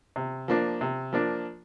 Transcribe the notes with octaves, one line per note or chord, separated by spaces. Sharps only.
C3
F3 A#3 D4
C3
F3 A#3 D4